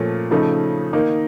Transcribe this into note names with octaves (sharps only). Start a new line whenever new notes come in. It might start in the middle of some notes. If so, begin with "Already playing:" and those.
Already playing: A#2 F3 A3 C#4 F4
C#3 F3 A3 D#4
D#3 A#3 D#4